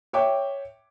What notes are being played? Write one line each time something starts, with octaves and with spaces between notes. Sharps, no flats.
C#5 E5 G5 D6